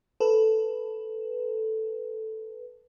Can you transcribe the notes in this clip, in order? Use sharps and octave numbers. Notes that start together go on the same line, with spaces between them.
A4 B4